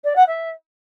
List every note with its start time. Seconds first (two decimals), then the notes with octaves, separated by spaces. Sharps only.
0.04 D5
0.16 F#5
0.27 E5